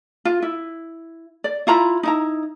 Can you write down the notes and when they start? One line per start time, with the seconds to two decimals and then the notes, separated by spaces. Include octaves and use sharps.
0.25 F4
0.42 E4
1.44 D5
1.67 E4 F4 A#5 B5
2.03 D#4 E4 A#5